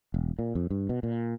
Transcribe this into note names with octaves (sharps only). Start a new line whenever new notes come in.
E1
A#2
F2
G2
B2
A#2